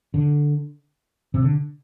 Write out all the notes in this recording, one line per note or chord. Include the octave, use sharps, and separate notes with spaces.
D3
C3
D3